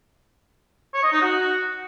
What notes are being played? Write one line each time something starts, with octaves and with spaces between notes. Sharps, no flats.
C#5
D#5
D#4
F#4